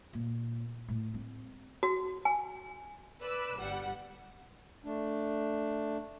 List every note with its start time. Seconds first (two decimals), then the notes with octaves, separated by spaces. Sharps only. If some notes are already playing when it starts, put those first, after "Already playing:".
0.13 A#2
0.88 A2
1.14 C4
1.83 F#4
2.25 G#5
3.23 B4 D5 B5 E6
3.60 G1 G3 F#5
4.84 A3 D4